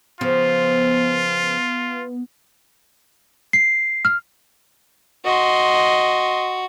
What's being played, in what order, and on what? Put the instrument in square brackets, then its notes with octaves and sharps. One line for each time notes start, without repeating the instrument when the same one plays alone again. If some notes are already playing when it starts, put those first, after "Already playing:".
[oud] C#3 F3 [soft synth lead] B3 [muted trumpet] F4
[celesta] C7
F6
[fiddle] F#4 [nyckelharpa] D#5 C6